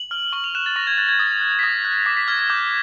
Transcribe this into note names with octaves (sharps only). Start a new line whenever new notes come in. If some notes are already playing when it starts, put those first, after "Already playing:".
Already playing: F#7
F6
C#6 F#7
F7
F#6 E7
A6
C#6 A#6
G#6
F#6 A6
G#6
D#6 A6
F#6
B6
D#6 A#6
F#6
D6 B6
B6
F6 G#6
G#6
D6 G6